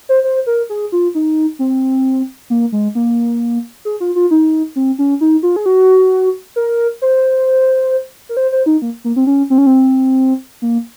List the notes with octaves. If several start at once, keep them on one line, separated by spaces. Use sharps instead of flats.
C5
C5
A#4
G#4
F4
D#4
C4
A#3
G#3
A#3
G#4
F4
F4
D#4
C4
C#4
D#4
F4
G#4
F#4
A#4
C5
A#4
C5
C5
D#4
A#3
A#3
C4
C#4
C4
C#4
C4
A#3